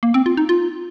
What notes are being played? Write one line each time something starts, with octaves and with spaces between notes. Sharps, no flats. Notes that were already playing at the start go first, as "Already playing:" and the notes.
A#3
C4
F4
D#4
F4